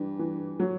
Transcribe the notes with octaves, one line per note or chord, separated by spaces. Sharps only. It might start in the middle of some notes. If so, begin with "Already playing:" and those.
Already playing: G2 E3
E3
F#3